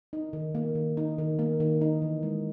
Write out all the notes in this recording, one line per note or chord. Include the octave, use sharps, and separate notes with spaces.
D#4
D#3
A#3
D#3
D#4
D#3
A#3
D#3
D#4
E3
G#3